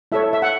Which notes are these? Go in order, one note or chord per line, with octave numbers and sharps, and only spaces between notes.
E4 A4 C#5 E5
E5
F#5